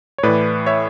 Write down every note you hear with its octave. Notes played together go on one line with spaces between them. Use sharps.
C#5
A2 E3 B4 D5
C#5 E5